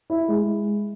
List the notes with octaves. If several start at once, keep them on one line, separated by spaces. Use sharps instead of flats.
E4
G#3